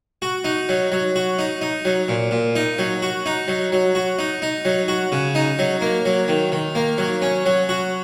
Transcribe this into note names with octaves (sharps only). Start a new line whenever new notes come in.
F#4
D#4
F#3
F#3
F#4
D#4
D#4
F#3
A#2
A#2
D#4
F#3
F#4
D#4
F#3
F#3
F#4
D#4
D#4
F#3
F#4
C#3
D#4
F#3
A#3
F#3
D#3
D#3
A#3
F#3
C#4
F#3
F#4